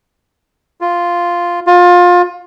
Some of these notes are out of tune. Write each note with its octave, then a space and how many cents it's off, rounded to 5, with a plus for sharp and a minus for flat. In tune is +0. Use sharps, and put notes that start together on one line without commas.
F4 -5
F4 +25